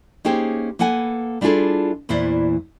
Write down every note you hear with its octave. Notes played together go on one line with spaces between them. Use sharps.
A#3 C#4 D#4 G4 G#4 C5
A#3 A4 B4 F#5 G#5
G3 D4 E4 F4 G#4 A4
E2 A#2 E3 E4 C5 D5